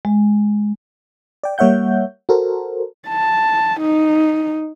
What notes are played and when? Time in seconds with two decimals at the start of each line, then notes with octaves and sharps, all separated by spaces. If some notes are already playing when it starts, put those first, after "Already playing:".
0.05 G#3
1.44 D5 G5
1.58 G3 A#3 C#5 E5 F#5 G6
2.29 F#4 A4 A#4 C5
3.08 A5
3.81 D#4